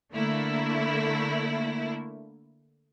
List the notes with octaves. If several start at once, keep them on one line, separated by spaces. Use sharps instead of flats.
D3 A3 A#3 E4